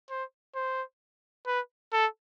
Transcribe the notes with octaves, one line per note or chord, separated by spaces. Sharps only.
C5
C5
B4
A4